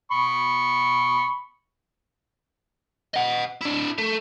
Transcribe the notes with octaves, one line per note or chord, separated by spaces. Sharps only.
B5 C#6
D#5 F#5
D4 E4
A3